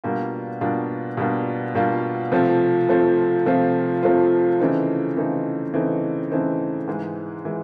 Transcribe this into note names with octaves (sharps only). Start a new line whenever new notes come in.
B2 G3 A#3 D4 F4
B2 G3 A#3 D4 F4
B2 G3 A#3 D4 F4
B2 G3 A#3 D4 F4
C3 F3 A3 C4 F4
C3 F3 A3 C4 F4
C3 F3 A3 C4 F4
C3 F3 A3 C4 F4
C#3 E3 A3 C4 D#4
C#3 E3 A3 C4 D#4
C#3 E3 A3 C4 D#4
C#3 E3 A3 C4 D#4
G#2 E3 G#3
E3 G#3